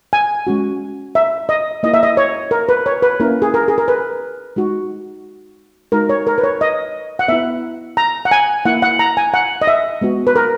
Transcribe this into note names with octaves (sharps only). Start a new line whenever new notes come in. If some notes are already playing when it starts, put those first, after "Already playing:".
G#5
G#3 C#4 F#4
E5
D#5
A#3 E4 D#5
E5
D#5
C#5
A#4
B4
C#5
B4
A#3 C#4 E4 A#4
G#4
A#4
G#4
A#4
B4
G#3 D#4 F#4
G#3 D#4 F#4 A#4
C#5
A#4
B4
C#5
D#5
F#5
B3 E4 E5
A#5
F#5
G#5
A#3 E4 F#5
F#5
A#5
G#5
F#5
D#5
E5
G#3 B3 F#4
B4
A#4